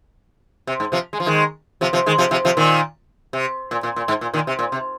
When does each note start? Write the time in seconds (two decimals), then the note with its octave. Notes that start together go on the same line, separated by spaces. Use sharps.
0.67 C3
0.80 G#2
0.92 C3 F3
1.13 G#3
1.20 F3
1.26 D#3 G#3
1.81 C3 F3
1.93 C3 F3
2.06 D#3 G#3
2.18 C3 F3
2.31 C3 F3
2.45 C3 F3
2.57 A#2 D#3
3.33 C3
3.71 A#2
3.83 A#2
3.96 A#2
4.08 G#2
4.21 A#2
4.34 A#2 D#3
4.47 C3
4.59 A#2
4.72 C3